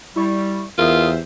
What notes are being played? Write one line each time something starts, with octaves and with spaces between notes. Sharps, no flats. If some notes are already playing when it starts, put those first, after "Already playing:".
G3 E4 C#6
E2 F4 G4 A#4 C5 E5 D#6